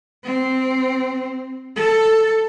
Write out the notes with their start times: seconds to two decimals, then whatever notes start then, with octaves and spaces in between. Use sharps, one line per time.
0.25 C4
1.77 A4